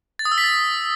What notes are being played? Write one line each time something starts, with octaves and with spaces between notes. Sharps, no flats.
A6
D#6
E6
B6
A6